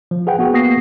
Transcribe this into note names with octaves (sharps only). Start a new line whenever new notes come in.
F3
G#4 B4 F#5 G5
B3 F#4 G#4
A#3 B3 F#4 D#6 A#6 C7